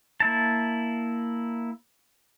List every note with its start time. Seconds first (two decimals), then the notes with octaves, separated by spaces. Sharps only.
0.20 A#3 E4 A5